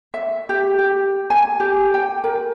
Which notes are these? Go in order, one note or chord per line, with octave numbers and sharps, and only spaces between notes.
E5
G4
G4
G#5
G4
G5
A#4